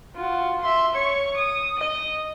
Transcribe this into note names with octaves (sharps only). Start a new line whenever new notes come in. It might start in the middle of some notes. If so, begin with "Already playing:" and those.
F4 F#4
E5 C6
C#5 C#6
D#6
D#5